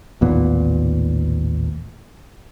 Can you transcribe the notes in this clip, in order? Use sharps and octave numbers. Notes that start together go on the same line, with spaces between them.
A1 D#2 A#2 B3